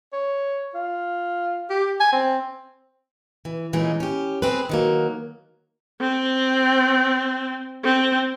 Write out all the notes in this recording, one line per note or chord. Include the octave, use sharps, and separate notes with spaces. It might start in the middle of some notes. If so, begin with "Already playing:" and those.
C#5
F4
G4
G#5
C4
E3
A#2 E3 G#3 C#4 D#4
C#4 G4
C4 G#4 B4
D#3 F#3 A#3
C4
C4